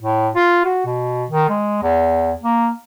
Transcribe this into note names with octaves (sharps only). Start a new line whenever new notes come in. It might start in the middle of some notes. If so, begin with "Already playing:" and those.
A2
F4
F#4
B2
D#3
G#3
E2
A#3